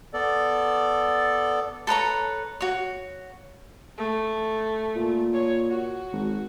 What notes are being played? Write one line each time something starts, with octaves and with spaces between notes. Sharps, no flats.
B3 A4 D5
A4 B4 C#5 A#5
F#4 C#5
A3
A#2
C#5
F#4
G#1